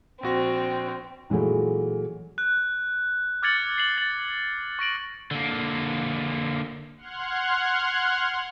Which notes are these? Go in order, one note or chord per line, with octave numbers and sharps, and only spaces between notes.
A#1 C4 F#4 A#6
A#2 E3 F#3 G#3 A3
F#6
D6 F6 G#6 A6 C#7 F#7
C7 F#7
A6 F#7
C#6 A#6 D7 F#7
D3 A#3
F#5 C6 F6 F#6 G#6